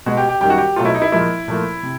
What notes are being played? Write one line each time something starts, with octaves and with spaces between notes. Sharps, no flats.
B2 G#3 F#4
G4
G4
F#2 D#3 G3 G4
F#4
G4
B2 F#3 A3 F4
E4
D#4
E4
A#2 F3 G#3 E4
A#2 F3 A3
C3